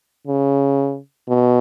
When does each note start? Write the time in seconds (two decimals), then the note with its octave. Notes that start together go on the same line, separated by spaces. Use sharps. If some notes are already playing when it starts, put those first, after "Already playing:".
0.27 C#3
1.28 B2